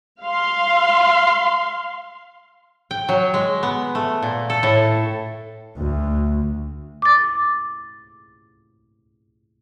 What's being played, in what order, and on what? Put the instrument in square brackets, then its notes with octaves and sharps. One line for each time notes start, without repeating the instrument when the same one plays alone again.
[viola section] F5 C6
[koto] G5
F#3
G#3
B3
A3
A#2
A4
A2
[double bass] D2
[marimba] D6 A6